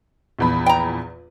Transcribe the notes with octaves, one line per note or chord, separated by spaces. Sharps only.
A#1 E2 B5
G5 A#5